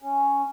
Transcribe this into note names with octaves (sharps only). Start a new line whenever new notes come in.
C#4